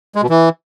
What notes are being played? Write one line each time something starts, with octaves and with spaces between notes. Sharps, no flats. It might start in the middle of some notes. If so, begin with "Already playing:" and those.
G#3
B2
E3